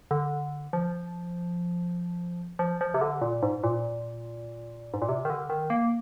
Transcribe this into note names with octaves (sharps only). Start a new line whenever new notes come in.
D3
F3
F3
F3
C3
D3
A#2
G#2
A#2
G#2
A#2
C3
D#3
D3
D#3
A#3